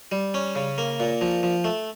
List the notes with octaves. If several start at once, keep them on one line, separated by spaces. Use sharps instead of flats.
G3
C#4
C#3
A#3
A#2
F3
F3
A3